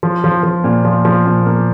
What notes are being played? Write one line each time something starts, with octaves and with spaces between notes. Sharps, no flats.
F3
F3
F3
A#2
F3
F3
A#2
A#3